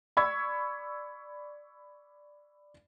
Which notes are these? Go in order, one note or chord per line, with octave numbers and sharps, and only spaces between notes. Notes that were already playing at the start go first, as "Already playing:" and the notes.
D5 B5 C#6 E6 G#6